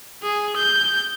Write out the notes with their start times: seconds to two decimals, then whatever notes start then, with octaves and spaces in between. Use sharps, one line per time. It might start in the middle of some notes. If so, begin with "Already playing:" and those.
0.23 G#4
0.56 G6